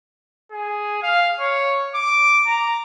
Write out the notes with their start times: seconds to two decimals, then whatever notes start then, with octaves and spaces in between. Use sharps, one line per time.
0.52 G#4
1.03 F5
1.40 C#5
1.95 D6
2.46 A#5